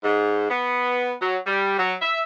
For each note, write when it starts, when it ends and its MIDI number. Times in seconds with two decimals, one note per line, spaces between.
0.04 0.49 44
0.50 1.13 59
1.21 1.38 54
1.47 1.74 55
1.79 1.95 54
2.02 2.22 76